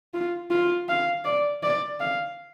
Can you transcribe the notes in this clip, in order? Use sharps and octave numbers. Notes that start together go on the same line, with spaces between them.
F4
F4
F5
D5
D5
F5